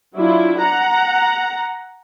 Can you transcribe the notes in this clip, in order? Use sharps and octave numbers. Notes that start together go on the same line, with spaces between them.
F#3 D4 E4 F4
F#5 A#5